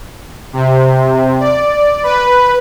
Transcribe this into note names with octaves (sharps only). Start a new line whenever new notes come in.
C3
D5
B4